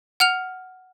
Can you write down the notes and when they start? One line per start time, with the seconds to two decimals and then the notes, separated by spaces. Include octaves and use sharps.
0.20 F#5 F6 F7